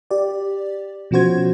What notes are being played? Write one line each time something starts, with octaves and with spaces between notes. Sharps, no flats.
G4 D5
B2 F3 C#4 F#4 C5 G#6